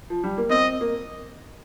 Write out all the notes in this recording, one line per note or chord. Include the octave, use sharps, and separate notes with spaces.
F3
G3
A#3
C4 D#5
A#3